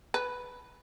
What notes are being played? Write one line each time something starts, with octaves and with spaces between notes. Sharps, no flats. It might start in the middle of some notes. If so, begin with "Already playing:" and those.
B4